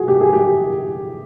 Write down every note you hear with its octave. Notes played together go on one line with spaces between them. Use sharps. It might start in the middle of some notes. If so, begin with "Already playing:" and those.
Already playing: F#4 G#4
G4
G#4
G4